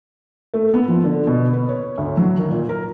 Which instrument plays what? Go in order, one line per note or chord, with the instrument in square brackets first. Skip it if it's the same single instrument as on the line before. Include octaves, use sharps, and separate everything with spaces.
[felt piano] A3
B3
F3
D3
B2
B4
C#5
D2
F#3
D#3
A#2
A#4